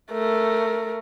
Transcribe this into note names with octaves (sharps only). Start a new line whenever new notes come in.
A3 A#4